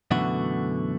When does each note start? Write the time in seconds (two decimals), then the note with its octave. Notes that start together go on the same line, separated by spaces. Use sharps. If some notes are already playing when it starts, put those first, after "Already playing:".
0.11 F#2 B2 D3 E3 A3 F#4